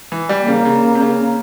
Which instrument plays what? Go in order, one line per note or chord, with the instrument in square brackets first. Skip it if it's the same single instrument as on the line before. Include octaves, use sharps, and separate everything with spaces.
[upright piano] E3
G3
[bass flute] A#3
[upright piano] C#3
C#3
C3
C#3